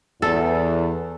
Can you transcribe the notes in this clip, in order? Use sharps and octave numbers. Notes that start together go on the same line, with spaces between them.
E2 A4